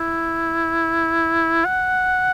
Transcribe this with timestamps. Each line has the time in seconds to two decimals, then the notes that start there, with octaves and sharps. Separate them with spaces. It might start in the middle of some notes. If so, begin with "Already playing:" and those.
Already playing: E4
1.65 F#5